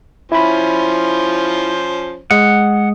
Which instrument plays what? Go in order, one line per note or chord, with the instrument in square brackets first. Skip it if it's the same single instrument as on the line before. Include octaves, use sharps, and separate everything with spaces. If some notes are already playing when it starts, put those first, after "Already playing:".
[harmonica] F3 C#4 C5 [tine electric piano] E4 B5
[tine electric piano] G#3 D#6 [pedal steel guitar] F#5